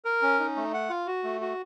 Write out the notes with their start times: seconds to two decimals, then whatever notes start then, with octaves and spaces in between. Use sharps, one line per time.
0.05 A#4
0.22 C#4
0.39 D#4
0.56 A3
0.74 F#5
0.89 F4
1.07 F#4
1.24 A3
1.41 F#4